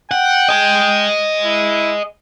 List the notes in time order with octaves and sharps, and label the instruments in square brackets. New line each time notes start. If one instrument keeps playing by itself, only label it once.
[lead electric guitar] F#5 [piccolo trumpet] G5
[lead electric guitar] D#5 G#5
[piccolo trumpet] E4